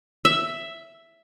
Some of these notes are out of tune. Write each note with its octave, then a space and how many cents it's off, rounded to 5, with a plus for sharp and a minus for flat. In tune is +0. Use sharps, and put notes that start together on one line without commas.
E5 +5